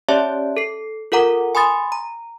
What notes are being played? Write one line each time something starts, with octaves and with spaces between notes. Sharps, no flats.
C#4 G4 C#5 D5 E5 A5
A4 C7
F4 A4 A#4 F#5 A#5 D6
G#5 B5 C6 D#6 A6
A#5